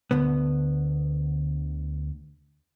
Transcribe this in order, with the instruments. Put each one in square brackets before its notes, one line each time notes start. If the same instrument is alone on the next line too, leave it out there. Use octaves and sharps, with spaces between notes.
[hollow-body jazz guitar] D2 D3 B3